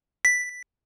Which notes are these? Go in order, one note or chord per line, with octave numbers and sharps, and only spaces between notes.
B6